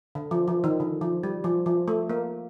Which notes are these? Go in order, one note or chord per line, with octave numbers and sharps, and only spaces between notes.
D3
F3
F3
D#3
D3
F3
G3
F3
F3
A3
A#3